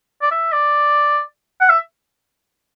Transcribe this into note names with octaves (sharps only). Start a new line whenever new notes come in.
D5
E5
D5
F#5
E5